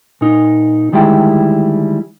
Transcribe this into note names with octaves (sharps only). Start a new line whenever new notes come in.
A#2 D#4
D2 D#3 G3 G#3 E4 G5